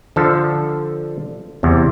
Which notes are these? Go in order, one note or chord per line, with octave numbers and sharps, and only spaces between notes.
D3 F3 A4 A5
E2 C3